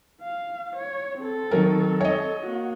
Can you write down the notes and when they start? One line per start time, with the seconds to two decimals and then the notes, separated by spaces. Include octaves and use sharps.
0.22 F5
0.75 C#5
1.19 C4 A4
1.51 D#3 F#3 A#4
2.01 C#5 D#5
2.43 A#3 F#4